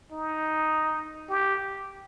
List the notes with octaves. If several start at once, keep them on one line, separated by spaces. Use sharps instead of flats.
D#4
G4